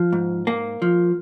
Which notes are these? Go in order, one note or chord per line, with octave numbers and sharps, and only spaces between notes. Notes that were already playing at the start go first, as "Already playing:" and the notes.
Already playing: F3
G#2
A#3
F3